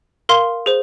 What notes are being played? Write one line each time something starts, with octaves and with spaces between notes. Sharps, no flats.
A#4 F5 C6
G#4 C5